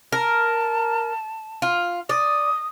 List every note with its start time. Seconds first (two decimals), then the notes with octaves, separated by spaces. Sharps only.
0.12 A#4 A5
1.62 F4
2.09 D5 D#6